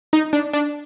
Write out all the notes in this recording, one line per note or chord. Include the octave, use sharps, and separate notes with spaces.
D#4
D4
D4